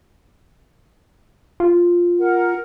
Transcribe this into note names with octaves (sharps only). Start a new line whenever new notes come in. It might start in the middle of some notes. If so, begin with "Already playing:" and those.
F4
A#4 F#5